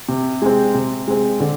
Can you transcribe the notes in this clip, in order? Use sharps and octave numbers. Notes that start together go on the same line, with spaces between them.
C3
G#3 C4
C3
G#3 C4
D3